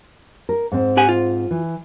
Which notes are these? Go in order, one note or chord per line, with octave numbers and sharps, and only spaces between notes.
A#4
G#2 C4
G4 F#5 G#5
F4
E3